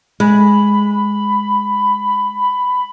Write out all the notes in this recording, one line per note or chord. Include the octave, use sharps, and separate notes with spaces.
G#3 B5